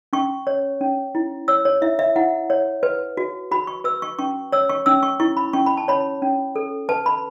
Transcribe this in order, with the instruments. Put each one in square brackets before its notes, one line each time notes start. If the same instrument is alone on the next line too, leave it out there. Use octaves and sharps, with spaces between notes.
[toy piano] C#4 C#6
C#5
C#4
E4
C#5 E6
C#5
E4 E5
E5
E4 F#5
C#5
B4
F#4
F#4 B5
C#6
B4 E6
C#6
C#4 C#6
C#5 E6
C#6
C#4 E6
C#6
E4 C#6
B5
C#4 C#6
B5
A5
C#5 B5
C#4
A4
B4 A5
B5